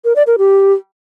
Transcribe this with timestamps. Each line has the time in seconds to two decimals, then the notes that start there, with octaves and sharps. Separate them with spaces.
0.05 A#4
0.16 D5
0.27 A#4
0.38 G4